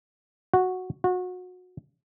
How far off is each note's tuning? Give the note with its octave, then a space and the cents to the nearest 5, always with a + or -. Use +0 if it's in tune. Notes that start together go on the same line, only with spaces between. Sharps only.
F#4 -5
F#4 -25